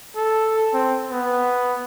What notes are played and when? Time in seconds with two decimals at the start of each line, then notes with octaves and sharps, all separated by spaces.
0.16 A4
0.74 C4
1.11 B3